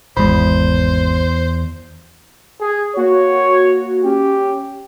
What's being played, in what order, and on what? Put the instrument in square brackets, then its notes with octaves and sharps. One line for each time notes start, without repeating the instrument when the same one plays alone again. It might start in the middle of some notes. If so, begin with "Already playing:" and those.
[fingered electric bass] G#1 G#3 [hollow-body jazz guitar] E2 B5 [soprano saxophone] C5
[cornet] G#4
[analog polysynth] A#3 F#4 [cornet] C#5
[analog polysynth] C#4 [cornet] G4